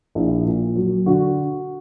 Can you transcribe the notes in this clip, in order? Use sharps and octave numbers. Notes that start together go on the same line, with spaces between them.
A#1 E4
A#2
F#3
D3 F#4